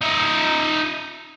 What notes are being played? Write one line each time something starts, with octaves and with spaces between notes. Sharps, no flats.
D#4 E5